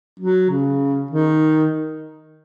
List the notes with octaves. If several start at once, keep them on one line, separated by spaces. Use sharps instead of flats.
F#3
C#3
D#3